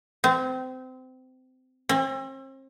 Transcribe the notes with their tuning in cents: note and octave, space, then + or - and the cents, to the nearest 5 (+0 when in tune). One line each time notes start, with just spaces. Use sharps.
C4 -25
C4 +40